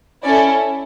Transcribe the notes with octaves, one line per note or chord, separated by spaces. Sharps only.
C#4 E4 A4 D5